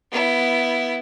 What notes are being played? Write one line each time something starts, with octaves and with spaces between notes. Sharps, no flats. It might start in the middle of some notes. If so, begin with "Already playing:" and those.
B3 E4